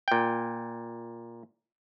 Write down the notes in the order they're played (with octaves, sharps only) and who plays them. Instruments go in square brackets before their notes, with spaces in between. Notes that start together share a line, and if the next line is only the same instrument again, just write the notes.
[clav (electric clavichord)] A#2 G5